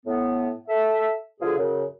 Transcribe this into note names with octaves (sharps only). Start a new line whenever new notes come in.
A2 B3
A4 E5
B2 D3 F3 F4 G#4
F#2 C#3